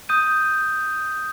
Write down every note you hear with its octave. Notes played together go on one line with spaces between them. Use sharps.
D#6 G6 D#7